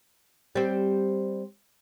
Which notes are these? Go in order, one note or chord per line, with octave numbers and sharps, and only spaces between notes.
G3 C4